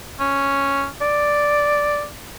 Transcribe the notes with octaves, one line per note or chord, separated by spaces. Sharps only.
C#4
D5